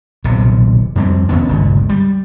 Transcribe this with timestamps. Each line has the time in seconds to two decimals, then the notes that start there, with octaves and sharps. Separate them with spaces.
0.24 D#1 B1 C3
0.96 F2 G3 G#3 C4
1.29 F1 D#3 B3 C#4
1.48 D1 G1 C#2 A#2
1.89 G3